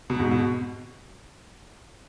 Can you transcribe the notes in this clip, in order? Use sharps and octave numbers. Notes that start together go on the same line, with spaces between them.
B2
G#2
B2